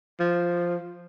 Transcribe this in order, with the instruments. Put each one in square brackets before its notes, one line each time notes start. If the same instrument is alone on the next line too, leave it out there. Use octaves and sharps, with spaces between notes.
[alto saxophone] F3